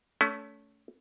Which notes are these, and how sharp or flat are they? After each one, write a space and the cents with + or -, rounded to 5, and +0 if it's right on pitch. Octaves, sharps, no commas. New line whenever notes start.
A3 +0 C#4 +30